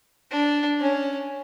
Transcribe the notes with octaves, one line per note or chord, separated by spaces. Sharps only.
D4
C#4